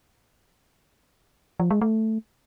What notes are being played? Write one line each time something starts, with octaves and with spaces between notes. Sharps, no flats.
F3
G#3
A3